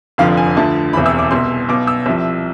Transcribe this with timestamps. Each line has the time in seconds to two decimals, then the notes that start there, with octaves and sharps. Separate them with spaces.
0.18 F1 F2 D3 F3 F5
0.37 G#5
0.57 D2 D3 F3 A5
0.93 E1 E2 C3 E3 B5
1.06 E6
1.19 D6
1.31 C2 B2 C6
1.69 B1 B2 D6
1.87 E6
2.06 C2 C3 F3